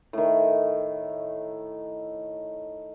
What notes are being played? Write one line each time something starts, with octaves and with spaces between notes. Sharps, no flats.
A2 D#3